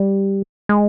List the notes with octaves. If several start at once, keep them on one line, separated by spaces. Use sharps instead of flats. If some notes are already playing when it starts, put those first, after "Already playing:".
Already playing: G3
G#3